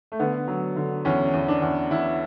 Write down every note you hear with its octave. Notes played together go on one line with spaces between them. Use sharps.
A3
D3 B3
F#3
D3
E2 C#4
E2
D4
E2
E2 E4